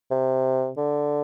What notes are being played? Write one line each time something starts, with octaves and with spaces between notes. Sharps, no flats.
C3
D3